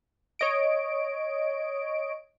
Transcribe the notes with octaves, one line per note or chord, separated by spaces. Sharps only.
C#5 D#5 D7